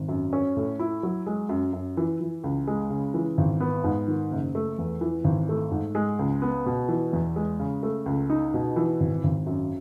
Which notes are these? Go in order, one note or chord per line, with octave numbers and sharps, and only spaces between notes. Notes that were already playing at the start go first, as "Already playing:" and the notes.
Already playing: G#1
F#2
C#4
A2
E4
F#3
G#3
F#2
F#2
E3
E3
C#2
G#3
C#3
E3
G#1
B3
G#2
D#3
F#1
A3
E2
E3
G#1
A3
G#2
G#3
C#2
B3
B2
E3
E2
G#3
C#3
A3
C#2
D#4
B2
E3
G#1
G#1
F#2